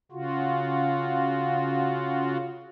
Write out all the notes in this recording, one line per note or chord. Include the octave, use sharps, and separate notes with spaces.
C#3 F4 F#4